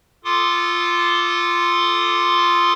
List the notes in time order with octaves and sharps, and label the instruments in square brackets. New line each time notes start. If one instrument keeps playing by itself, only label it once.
[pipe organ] F4 A4 C6 D6 D#6